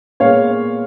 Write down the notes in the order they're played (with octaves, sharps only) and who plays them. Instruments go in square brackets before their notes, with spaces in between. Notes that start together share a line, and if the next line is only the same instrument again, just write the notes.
[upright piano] A#2 G#3 B3 C#5 F5